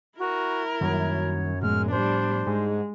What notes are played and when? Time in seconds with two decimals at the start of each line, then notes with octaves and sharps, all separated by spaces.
0.19 E4 F#4 A#4
0.81 F#2 D#3 G3 A#3 C#5
1.62 A2 F3 G#3 B3 F6
1.91 G3 D4 C5
2.46 G#2 G#3